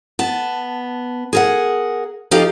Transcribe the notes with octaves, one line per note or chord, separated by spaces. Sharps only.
B3 A5
G#4 A#4 F#5
F3 D#4 G4 A4 F5